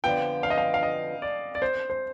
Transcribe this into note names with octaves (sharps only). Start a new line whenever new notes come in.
F2 D3 F3 B3 F4 G5
F5
D#5
F5
F5
D#5
D5
D5
C5
C5